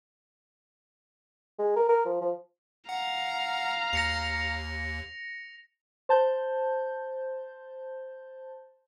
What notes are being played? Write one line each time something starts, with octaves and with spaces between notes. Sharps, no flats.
G#3
A#4
A#4
F3
F3
F5 F#5 A#5
D#2 A#6 C#7 F7
C5 A5 G6